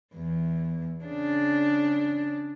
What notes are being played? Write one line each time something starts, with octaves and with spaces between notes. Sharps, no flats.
E2
C#3 D4